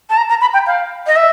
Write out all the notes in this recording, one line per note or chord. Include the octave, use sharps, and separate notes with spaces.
A5
A#5
A#5
B5
G5
F5
D#5
E5